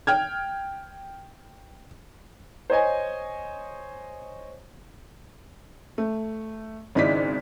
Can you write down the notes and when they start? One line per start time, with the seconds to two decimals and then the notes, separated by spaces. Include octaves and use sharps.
0.07 G5 F6 G#6
2.70 C5 C#5 D#5 G#5
5.98 A3
6.95 G#1 C#3 D#4 E4 D5 B6